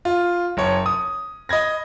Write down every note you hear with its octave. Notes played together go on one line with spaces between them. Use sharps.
F4
F#1 C#5
D#6
D#5 B5 G#6 A#6